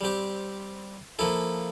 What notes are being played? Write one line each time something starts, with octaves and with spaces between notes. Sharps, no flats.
G3 C4 G4
F3 A#3 E4 A4